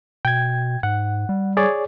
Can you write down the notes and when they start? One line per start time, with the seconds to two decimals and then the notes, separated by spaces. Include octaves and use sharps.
0.25 B2 G5 G#6
0.83 G#2 F#5
1.29 G3
1.57 G#4 C#5 D5